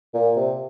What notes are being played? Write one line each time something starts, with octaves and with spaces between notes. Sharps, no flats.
A#2
C3